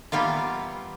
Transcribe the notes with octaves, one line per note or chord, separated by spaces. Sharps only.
E3 G3 A#3 B3 F4